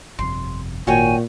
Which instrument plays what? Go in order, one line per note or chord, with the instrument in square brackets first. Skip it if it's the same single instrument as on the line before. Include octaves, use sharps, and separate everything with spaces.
[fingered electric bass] G1 F2 C3 [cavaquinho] C6
[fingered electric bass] G#1 D#3 [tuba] A#2 [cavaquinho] F#4 C#5 G5 [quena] G#5